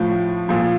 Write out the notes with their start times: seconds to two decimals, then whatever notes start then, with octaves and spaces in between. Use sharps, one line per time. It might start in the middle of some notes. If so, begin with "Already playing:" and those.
Already playing: A2 F3
0.49 A#2 F3